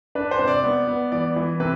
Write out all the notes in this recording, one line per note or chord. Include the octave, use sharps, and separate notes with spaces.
D4 B4
C5
C3
D5
B3
B3
E3 D5
E3
C3 B4